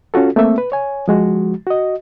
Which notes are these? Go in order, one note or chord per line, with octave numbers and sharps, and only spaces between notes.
C#4 F4 F#4 A4
A3 A#3 C4 E5
B4
C#5 G#5
F3 G#3 F#4
F#4 D#5